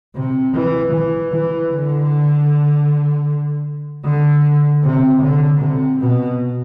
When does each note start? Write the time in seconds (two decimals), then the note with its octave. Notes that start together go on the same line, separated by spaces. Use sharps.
0.15 C3
0.54 E3
0.93 E3
1.32 E3
1.71 D3
4.05 D3
4.84 C3
5.22 D3
5.61 C3
6.01 B2